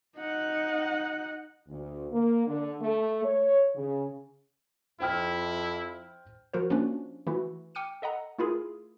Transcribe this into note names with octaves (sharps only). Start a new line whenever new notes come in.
D#4 F#5
D2
A#3
D3
A3
C#5
C#3
F2 E4 C5 G5 F6
F3 F#4 A#4 C5
F3 A#3 C#4 D4 F#4
E3 A3 E4 F#4
G5 D6 F6 C#7 D#7
A4 D#5 F#5 A#5
A3 E4 F4 G#4 A#4